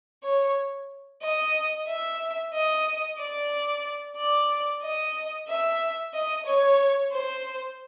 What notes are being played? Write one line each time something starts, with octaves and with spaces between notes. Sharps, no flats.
C#5
D#5
E5
D#5
D5
D5
D#5
E5
D#5
C#5
C5